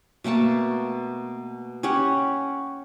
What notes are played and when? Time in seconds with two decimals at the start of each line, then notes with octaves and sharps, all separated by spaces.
0.24 B2 A3 A#3 A5
1.83 C#4 G4 C#5 F#5